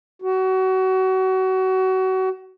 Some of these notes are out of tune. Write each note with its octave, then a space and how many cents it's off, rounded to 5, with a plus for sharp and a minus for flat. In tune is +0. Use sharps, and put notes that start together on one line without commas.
F#4 +30